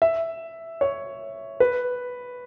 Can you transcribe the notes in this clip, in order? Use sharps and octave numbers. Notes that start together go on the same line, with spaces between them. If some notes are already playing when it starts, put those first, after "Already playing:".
E5
C#5
B4